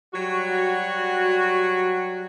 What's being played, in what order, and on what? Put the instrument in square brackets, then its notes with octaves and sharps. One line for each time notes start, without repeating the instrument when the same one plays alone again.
[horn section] F#3 G3 F#4